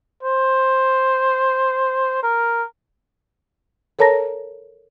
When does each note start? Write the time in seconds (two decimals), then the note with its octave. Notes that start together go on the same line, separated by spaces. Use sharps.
0.23 C5
2.23 A#4
3.99 A4 A#4 C#5 A5 A#5 A#6